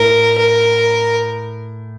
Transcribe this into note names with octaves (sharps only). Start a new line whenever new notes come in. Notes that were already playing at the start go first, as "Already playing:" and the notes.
Already playing: A2 A#4
A#4